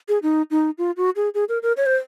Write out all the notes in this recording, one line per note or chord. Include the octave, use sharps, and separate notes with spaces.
G#4
D#4
D#4
F4
F#4
G#4
G#4
A#4
A#4
C#5
C5